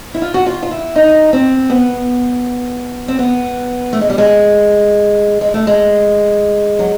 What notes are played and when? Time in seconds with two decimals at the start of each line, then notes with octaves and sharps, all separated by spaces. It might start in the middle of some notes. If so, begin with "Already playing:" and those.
0.14 E4
0.22 F4
0.34 F#4
0.46 F4
0.63 F4
0.71 E4
0.96 D#4
1.33 C4
1.70 B3
3.08 C4
3.19 B3
3.93 A3
4.01 G#3
4.10 G3
4.18 G#3
5.41 G#3
5.54 A3
5.67 G#3
6.79 F#3